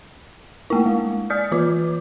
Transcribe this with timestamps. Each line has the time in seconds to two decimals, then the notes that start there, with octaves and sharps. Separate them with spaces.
0.70 A3 A#3 E4
0.86 G#3
1.30 D5 D#6 F6 G6
1.52 E3 F4 D6